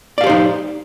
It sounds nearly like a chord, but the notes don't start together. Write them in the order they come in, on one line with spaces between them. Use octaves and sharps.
D5 F5 G4 C5 D#4